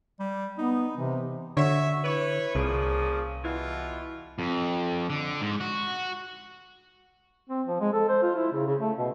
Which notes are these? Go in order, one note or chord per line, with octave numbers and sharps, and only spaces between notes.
G3
B3 D#4
C3 E3
D3 F#4 C#5 E5
E4 B4 C#5
C2 A#2 C#3 F3
B2 E3 F4
F2
D3
G#2
F#4
C4
F3
G#3
A4
C5
F4
E4
C#3
C#3
A3
B2